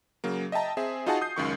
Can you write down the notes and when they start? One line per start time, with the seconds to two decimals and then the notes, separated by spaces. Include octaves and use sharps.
0.24 C#3 F#3 A#3
0.52 D#5 E5 G5 A5 A#5
0.77 C4 G#4 E5
1.06 D#4 F4 F#4 G#4 F#5 A5
1.21 D#6 G6 C7
1.36 C#2 F#2 D#3 C#6